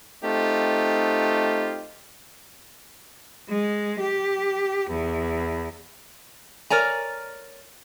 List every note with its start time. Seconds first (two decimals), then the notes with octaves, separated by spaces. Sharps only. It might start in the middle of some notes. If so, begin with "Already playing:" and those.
0.23 A3 C4 D#4 F4 G4
3.48 G#3
4.00 G4
4.89 E2
6.70 A#4 C#5 D5 G#5 A#5